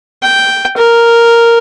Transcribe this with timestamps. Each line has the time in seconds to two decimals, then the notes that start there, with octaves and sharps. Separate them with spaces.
0.22 G5
0.76 A#4